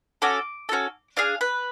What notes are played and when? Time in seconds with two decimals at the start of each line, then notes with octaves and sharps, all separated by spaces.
0.22 C#4 F#4 A4 D6
0.69 C#4 F#4 A4
1.17 D4 G#4 F5
1.41 B4